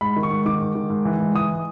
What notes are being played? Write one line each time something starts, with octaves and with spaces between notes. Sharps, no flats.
G#2 B5
D#3
C#6
G#2
D#3 D6
G#2
D#3
G#2
E3
G#2
E3 D#6